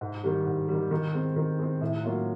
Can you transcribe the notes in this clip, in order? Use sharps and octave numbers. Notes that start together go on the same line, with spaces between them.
G#2
D#3 G3
G#2
D#3 G3
D#3
G#3 C4
D#3
G#3 C4
A2
F#3 A#3 C#4 F4